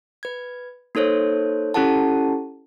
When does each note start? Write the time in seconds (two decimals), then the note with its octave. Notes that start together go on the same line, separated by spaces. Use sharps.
0.23 B4 G#6
0.95 A#3 D#4 A4 C5 C#5
1.74 C#4 E4 G4 A4 F#5 A5